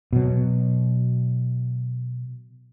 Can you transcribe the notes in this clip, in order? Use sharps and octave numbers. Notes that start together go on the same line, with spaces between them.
B2 F#3